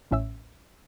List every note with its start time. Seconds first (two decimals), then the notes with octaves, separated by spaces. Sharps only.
0.11 A1 A2 C#4 E5 E6